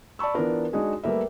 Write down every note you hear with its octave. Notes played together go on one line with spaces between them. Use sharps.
D5 A5 B5 C#6 E6
E3 B3 D4 F4 A#4 B4
G#3 D4 D#4 F#4 G#4
G3 A3 A#3 A#4 B4 E5